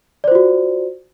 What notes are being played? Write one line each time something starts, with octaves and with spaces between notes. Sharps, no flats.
F4 F#4 C5 D5